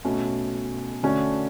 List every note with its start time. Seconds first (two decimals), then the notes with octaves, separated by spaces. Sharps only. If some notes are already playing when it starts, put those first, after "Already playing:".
0.05 B2 A3 C#4
1.03 D3 A3 C#4 F#4